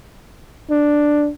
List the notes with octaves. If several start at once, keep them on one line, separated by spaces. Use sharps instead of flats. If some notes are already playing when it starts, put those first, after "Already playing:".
D4